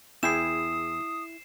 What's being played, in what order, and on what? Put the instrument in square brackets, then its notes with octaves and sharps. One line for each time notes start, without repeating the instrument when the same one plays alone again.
[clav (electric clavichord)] E2 G#4 G5 [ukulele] E4 [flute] D#6 [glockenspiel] C7 E7